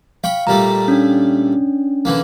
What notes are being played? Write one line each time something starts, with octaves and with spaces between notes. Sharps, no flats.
F5 G5 B5 C#6
A#2 G3 A3 A#5
C#4 D4
D3 E3 A#3